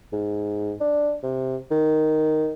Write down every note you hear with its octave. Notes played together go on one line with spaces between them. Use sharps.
G#2
D4
C3
D#3